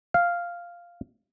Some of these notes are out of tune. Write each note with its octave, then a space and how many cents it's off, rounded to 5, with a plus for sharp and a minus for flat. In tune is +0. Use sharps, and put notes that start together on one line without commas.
F5 -5